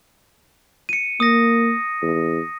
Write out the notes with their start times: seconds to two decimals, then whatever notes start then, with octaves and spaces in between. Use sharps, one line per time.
0.89 C#7 D#7
1.20 A#3 D#6 A#6
2.02 E2